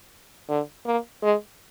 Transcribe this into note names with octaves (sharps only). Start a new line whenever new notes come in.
D3
A#3
G#3